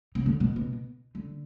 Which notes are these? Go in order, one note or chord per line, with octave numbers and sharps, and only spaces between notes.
C#3
D3
B2
B2
D3